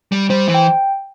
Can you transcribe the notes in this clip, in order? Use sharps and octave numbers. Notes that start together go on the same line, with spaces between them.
G3
G3 C5
E3
G5